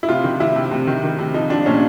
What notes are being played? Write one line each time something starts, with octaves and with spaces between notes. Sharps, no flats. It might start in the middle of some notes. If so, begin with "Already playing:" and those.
E4
C3 F4
D#3
C3 E4
C3
C3
D#3
D#3
C3
F3 D#4
F3 D4
A#2 C#4